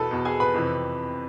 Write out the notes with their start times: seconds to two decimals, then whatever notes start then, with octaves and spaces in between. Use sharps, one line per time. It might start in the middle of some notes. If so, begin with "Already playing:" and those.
Already playing: E2 B2 A4 B4 A5
0.11 E2 B2
0.25 G#4 G#5
0.40 B4 B5
0.54 F2 C3 E3